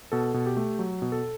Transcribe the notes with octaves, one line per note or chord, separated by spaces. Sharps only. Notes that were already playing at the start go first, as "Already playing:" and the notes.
B2 A4
B2
G4
A3
F#3
B2
A4